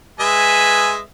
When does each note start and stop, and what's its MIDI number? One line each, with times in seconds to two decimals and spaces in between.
0.20 1.02 56
0.20 1.02 71
0.20 1.02 76
0.20 0.94 80